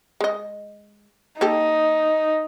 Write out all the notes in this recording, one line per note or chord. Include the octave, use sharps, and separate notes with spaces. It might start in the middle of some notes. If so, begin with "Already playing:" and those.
G#3 D#5
A#3 D#4 G4 A4